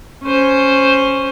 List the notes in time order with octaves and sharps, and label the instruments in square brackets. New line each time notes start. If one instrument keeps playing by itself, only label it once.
[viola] C#4 C5